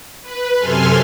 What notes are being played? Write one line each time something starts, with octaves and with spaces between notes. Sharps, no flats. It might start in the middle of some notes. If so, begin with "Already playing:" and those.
B4
F#2 C3 A4 G#5 C6 F6